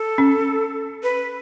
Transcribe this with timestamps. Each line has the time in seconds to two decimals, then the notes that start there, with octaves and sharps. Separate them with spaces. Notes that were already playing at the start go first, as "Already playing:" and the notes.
Already playing: A4
0.18 C#4
1.03 B4